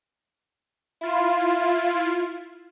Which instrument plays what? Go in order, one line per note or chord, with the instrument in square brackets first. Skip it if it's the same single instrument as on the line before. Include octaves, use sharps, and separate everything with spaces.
[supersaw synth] E4 F4